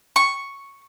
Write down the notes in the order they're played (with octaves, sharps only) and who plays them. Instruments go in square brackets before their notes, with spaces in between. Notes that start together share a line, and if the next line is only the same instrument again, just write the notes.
[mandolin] C#6